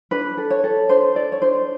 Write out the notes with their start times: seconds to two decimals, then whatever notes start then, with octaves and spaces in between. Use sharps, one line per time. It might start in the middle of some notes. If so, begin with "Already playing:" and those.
0.11 D4 B4
0.37 A4
0.50 C#5
0.64 A4
0.89 D4 C5
1.15 A4 D5
1.32 C#5
1.42 D4 C5